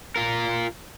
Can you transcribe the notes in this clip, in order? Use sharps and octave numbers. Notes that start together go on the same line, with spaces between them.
F4 A#4